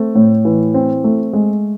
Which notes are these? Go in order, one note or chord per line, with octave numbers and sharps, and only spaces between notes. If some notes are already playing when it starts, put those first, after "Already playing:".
Already playing: A3 C4
A2
E3
C4
A3
G#3